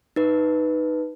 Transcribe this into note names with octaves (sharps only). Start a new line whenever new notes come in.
D#4 B4